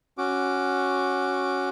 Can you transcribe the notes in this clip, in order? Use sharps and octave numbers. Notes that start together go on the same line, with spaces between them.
C#4 F#4 D6